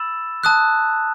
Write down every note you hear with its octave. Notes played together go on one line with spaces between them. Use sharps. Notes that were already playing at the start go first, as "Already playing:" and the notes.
Already playing: B5 E6 A6 E7
A5 D#6 F#6